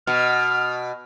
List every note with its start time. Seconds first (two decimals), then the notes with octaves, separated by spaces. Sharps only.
0.07 B2 F6